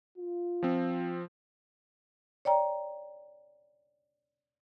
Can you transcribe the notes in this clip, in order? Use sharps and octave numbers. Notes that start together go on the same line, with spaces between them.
F4
F3 C4
C#5 D5 G5 A#5